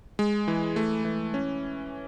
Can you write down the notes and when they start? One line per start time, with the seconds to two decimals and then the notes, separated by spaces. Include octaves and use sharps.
0.19 G#3
0.48 E3
0.76 A3
1.05 E3
1.34 C#4